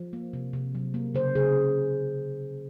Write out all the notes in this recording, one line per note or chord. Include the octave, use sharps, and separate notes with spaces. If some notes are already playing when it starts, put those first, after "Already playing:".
Already playing: F3
A#3
C3
C3
F#3
A#3
C#3 C5
C#3 G#4